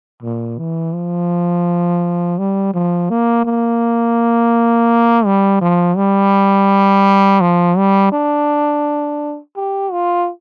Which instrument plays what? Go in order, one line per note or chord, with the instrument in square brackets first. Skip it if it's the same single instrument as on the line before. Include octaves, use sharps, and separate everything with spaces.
[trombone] A#2
E3
F3
G3
F3
A#3
A#3
G3
F3
G3
F3
G3
D4
G4
F4